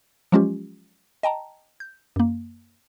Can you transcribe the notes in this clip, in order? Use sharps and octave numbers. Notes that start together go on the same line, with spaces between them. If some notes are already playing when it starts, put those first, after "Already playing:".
F3 F#3 G#3 C#4 F4 G4
D#5 G5 A5 A#5
G6
F#2 A#3